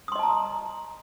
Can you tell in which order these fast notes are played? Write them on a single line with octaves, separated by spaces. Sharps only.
D#6 C6 D#5 A5 A#5